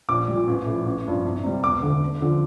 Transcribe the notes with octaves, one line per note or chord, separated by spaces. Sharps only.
A#1 D6
A#2 G3
A1
A2 F3
A1
G2 F3
C2
C3 G3
E1 D6
D2 D3
D2
D3 F3